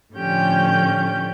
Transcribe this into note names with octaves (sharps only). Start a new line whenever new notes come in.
A2 D3 F3 C#4 G4 G6